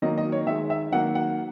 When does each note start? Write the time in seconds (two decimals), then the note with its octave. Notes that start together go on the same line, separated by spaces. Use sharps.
0.02 D#3 F#3 A#3 D#5
0.18 D#5
0.32 C#5
0.47 D#3 E5
0.50 G#3
0.70 E5
0.92 D#3 F#3 A#3 F#5
1.15 F#5